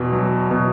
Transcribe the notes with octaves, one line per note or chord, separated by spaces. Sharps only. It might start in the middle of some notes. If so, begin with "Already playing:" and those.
Already playing: E2 B2
F#3
B2